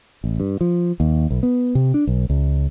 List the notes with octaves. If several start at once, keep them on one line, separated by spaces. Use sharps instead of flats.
A1
G2
F3
D#2
B1
B3
C3
D4
B1
C#2